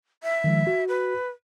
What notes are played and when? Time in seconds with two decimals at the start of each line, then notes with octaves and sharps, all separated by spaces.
0.23 E5
0.44 D#3 F3 G#3
0.67 F#4
0.88 B4